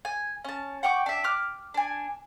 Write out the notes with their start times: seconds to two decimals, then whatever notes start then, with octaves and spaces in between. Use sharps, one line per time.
0.05 G#5
0.45 C#4 A5
0.83 F#5 G5 C#6 D6
1.06 D4 E5
1.24 D6 F6 F#6
1.74 D4 G#5